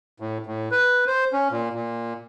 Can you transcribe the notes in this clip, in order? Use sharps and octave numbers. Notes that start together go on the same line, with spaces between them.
A2
A2
B4
C5
C#4
A#2
A#2